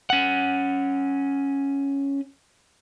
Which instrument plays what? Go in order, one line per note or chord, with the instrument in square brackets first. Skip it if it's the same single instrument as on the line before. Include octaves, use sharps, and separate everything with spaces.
[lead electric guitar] C#4 F#5